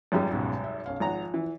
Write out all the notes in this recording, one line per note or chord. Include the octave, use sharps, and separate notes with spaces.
G#1 F#2 G3 D#4 F4 G#4
C#2 G#2 B2
E5
B1 C#4 F5
G#1 F3 F#5 A#5
E3